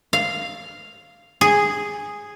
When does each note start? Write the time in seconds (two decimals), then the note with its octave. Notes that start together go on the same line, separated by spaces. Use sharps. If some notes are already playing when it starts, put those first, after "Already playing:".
0.13 F5
1.41 G#4